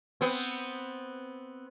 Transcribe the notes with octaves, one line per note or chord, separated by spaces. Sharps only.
B3 C4